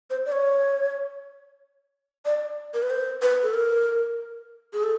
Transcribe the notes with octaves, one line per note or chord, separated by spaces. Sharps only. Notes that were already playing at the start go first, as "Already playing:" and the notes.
C5
D5
C#5
D5
A#4
B4
C5
B4
A4
A#4
G#4
A4